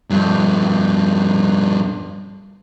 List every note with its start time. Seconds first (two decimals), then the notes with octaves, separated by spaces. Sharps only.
0.10 G2 F3